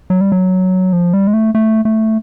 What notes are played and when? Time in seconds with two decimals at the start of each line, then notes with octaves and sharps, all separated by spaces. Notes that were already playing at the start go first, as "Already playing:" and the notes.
0.10 F#3
0.21 G3
0.32 F#3
0.93 F3
1.14 G3
1.27 G#3
1.33 A3
1.55 A3
1.85 A3